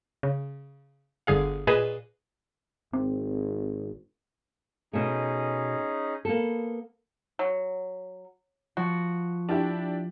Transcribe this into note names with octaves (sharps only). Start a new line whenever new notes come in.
C#3
G1 D3 G#4 F5
A#2 G#4 B4 D#5 D#6 E7
G#1 C4
B2 A3 C#4 D#4 G#4
A#3 B3 A4
F#3
F3 F#4
D4 E4 G4